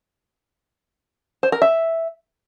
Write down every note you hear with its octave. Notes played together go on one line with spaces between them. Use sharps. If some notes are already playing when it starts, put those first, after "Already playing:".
C5
A#4
E5